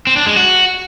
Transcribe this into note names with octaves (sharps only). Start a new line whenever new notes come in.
C4
D4
G#3
F#4